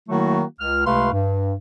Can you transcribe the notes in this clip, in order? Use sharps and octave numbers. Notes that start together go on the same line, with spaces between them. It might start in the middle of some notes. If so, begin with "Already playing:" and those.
D#3 F#3 A3 A#3 E4 F#4
C#2 F6
C#2 C3 A3 B4 F5 C6
G2